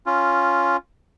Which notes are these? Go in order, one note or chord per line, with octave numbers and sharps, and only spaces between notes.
C#4 F4